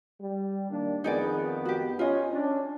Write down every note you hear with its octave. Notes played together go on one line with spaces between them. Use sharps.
G3
D#3 A#3 D4
F2 D#3 B3 D#4 G#4 D5
F#4 G4
C#4 F4 D#5
C#4 D4